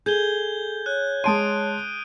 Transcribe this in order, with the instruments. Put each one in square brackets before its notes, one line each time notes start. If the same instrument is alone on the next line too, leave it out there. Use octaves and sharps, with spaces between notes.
[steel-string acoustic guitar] G#4 [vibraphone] A4 [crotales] G6 G#6 G7
[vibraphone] C#5 [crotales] F#6
[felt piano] G#3 A5 C6 [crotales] D#6 D7 D#7